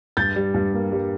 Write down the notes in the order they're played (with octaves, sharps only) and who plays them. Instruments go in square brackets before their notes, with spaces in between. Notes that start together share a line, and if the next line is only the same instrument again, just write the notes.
[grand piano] G2 G6 A6
G3
G2
A#3
G3